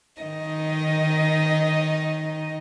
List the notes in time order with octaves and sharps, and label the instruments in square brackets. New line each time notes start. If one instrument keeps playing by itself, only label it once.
[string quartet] D#3 D#4 D#5